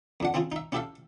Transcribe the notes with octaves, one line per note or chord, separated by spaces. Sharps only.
F2 D4 F#5
C4 C#4 E4 F4 G#4
D#4 E5
C#4 E4 G4 A4 E5 F5